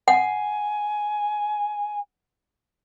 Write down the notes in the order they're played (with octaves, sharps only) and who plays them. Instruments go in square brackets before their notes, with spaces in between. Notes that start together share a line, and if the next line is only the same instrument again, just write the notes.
[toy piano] F#5 [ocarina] G#5